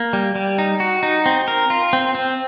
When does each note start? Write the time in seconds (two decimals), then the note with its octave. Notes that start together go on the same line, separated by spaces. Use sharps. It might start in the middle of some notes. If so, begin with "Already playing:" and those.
Already playing: A#3
0.13 G3
0.35 G3
0.58 D#4
0.80 F#4
1.03 D#4
1.26 C4
1.48 A#4
1.70 F4
1.93 C4
2.15 C4